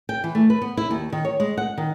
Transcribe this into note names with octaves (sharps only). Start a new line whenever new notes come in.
G5
E3
A3
B4
B3
E4
D#2
D#3
C#5
G#3
F#5
D#3